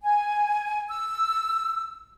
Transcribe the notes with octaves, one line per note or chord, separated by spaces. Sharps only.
G#5
E6